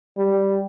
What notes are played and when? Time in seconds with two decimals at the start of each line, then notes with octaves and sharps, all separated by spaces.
0.18 G3